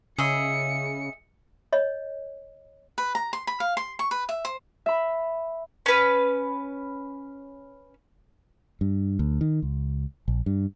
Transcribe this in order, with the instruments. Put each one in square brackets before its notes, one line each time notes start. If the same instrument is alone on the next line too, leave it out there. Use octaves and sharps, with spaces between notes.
[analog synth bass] C#3 [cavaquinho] G#4 D#5 E5 [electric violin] C#7
[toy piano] C#5 D#5
[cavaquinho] B4
A#5
C6
B5
F5
C6
C#6
B4
E5
C5
[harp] E5 B5
[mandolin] C#4 B4
[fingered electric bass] G2
D2
D#3
C#2
A#1
G2